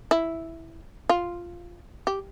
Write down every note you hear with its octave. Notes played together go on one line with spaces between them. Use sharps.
E4
F4
G4